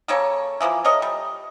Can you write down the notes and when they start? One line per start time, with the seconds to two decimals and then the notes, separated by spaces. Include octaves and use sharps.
0.08 C#3 A#3 A4 C#5
0.60 E3 F3 G3 A#3
0.84 A4 A#4 C#5 D#5
1.02 G3